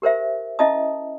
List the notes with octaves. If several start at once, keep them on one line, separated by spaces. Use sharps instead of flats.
G4 A#4 C5 E5
C#4 E4 D#5 E5 A5 D#6